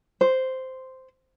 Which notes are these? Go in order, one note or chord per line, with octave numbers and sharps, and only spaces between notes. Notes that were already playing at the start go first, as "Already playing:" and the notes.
C5